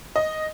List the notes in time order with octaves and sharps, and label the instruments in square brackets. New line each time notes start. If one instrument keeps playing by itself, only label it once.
[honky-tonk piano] D#5